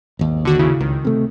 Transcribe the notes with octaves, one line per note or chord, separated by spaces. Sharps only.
G#1 D#2
D3 F#4
C#3 E4
C#2 D#3
C3 A3